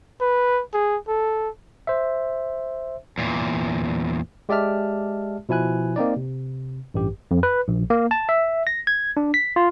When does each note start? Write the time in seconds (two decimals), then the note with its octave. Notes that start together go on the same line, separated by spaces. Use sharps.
0.21 B4
0.73 G#4
1.08 A4
1.87 C5 E5
3.18 E2 A#2
4.49 G#3 G4 D5 E5 A5 F6
5.49 B2 F3 E4 G#5 F#6
5.96 A#3 C4 D#4 D5
6.16 C3
6.94 A1 G2 G4
7.31 F2
7.43 B4
7.68 A#1
7.90 A#3
8.11 A5
8.29 E5
8.67 A#6
8.87 G#6
9.17 D4
9.34 B6
9.56 F4